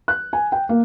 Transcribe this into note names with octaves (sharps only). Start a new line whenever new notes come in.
F#6
G#5
G5
A#3